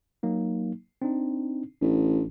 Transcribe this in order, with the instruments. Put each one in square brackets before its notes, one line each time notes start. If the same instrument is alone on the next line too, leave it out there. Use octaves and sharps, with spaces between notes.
[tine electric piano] F#3 A#3 D#4
C4 D4 D#4
[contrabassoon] A1 [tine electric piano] D4